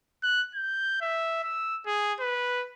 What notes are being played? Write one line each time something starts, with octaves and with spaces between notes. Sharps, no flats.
F#6
G6
E5
E6
G#4
B4